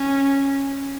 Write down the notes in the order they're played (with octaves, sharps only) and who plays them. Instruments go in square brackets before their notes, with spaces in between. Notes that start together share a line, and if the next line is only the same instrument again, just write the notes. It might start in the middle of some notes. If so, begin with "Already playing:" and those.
Already playing: [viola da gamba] C#4